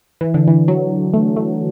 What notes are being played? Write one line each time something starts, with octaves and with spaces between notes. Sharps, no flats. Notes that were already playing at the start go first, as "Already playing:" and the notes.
E3
D3
E3
F#3
A3
A3